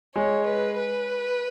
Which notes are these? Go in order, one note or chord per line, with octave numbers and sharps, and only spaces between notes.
G#3 C#5
B4
B4